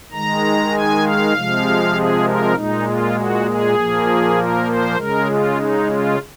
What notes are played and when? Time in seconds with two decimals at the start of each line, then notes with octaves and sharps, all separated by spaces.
0.12 D#3 G#3 A#5
0.73 G#5
1.03 F5
1.33 C3 F3 G#3
1.93 G#4
2.24 A#4
2.54 A#2 G#3 D#4
2.84 F4
3.15 F#4
3.44 G#4
3.75 A#2 F3 A#3
4.36 A#4
4.66 C5
4.96 C#3 G#3 A#4
5.26 F4
5.57 D#4
5.87 F4